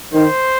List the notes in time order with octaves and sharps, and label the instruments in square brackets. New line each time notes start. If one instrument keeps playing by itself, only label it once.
[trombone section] D#3 [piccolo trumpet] C5